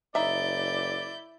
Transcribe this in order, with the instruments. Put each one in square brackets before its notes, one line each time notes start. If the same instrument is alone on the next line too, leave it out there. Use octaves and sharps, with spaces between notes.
[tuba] F#1 [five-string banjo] D#4 E5 [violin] E4 G6 [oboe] D5